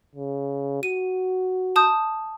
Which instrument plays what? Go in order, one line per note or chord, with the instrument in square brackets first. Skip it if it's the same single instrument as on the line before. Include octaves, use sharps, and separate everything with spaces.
[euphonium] C#3
[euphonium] F#4 [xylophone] D#7
[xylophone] A5 D#6 G6